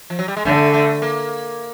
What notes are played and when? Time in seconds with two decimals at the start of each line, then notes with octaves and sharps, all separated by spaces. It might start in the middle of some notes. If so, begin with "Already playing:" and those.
0.10 F3
0.19 F#3
0.28 G3
0.37 G#3
0.45 D3 A3
0.74 A3
1.02 A#3